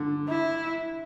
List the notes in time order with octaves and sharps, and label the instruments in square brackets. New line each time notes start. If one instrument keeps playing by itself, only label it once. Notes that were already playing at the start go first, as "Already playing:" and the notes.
Already playing: [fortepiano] D3
[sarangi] E4